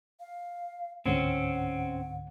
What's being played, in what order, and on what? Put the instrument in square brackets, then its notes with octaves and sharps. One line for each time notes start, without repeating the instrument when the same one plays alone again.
[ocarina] F5
[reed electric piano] C#2 G#2 D3 [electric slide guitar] C4 C#4 [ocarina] F#5